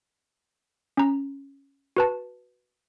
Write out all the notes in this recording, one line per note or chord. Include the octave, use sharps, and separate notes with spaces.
C#4 A#5
F#4 B4 A5